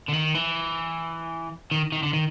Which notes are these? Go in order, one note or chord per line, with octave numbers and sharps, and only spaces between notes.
D3
D#3
E3
D#3
D#3
D3
D#3